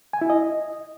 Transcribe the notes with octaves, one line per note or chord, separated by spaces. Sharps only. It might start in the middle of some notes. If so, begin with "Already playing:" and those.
G#5
E4
D#5